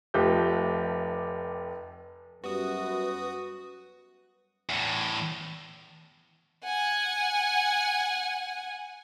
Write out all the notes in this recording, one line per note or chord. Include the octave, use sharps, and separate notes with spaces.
F1 F3 A3 G4 G6
F#2 G3 B3 F#4 B4 D#6
E2 A2
F#5 G#5